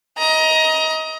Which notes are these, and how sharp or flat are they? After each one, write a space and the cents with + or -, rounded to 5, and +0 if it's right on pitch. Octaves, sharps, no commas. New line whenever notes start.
D#5 +25 A#5 +20